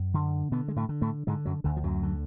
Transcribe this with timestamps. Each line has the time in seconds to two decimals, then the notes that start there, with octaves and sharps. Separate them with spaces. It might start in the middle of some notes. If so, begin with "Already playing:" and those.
Already playing: F#2
0.14 D3
0.52 B2 D3 B3
0.68 G#3
0.76 A2 A3
0.89 D3
1.02 A2 A3
1.27 G#2 D3 G#3
1.45 F#2 F#3
1.64 D2 D3
1.76 F3
1.84 F#2 F#3
2.03 D3